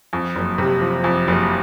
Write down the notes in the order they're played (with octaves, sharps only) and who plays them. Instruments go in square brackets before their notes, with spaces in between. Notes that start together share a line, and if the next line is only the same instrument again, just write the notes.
[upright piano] F2
F#1
C3
F3
F2
F#1